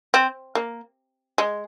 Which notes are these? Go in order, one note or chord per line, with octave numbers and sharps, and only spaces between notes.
C4
A#3
G#3